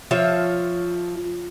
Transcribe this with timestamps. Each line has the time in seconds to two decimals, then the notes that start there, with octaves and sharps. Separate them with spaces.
0.11 F3 F4 C#5 E5